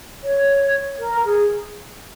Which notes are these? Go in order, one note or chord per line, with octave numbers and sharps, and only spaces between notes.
C#5
A#4
G#4